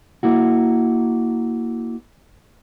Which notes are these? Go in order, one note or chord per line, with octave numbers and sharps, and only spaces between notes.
A#3 E4 F#4